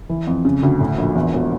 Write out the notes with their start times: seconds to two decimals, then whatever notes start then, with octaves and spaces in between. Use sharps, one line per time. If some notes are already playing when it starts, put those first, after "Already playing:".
0.09 E3
0.27 F2
0.45 C#3
0.63 D2
0.80 A2
0.98 A#1
1.15 E2
1.33 E1